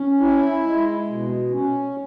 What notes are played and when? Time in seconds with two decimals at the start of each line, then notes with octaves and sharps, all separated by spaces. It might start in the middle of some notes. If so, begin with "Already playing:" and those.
Already playing: C#4
0.20 E4
0.63 G#3
1.07 B2
1.51 C#4